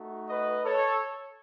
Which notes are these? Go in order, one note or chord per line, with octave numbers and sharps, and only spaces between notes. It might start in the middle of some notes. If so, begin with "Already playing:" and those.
Already playing: A3 D#4 F#4
B4 D#5
A4 C#5